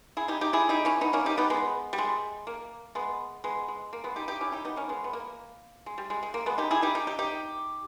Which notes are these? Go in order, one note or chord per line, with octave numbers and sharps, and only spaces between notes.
E4 G#4
D#4 G4
D#4 G4
E4 G#4
D#4 G4
C#4 E4
B3 D#4
A#3 C#4
D#4 G4
B3 D#4
G#3 B3
G3
G#3
A#3
G#3 B3
G#3 B3
G#3
A#3
G#3 B3
D#4 G4
D#4 G4
C#4 E4
D#4 G4
B3 D#4
A#3 C#4
G#3 B3
B3
A#3
G#3
G3
G#3
G#3
A#3
G#3 B3
D#4 G4
E4 G#4
D#4 G4
D#4 G4
D#4 G4
D#4 G4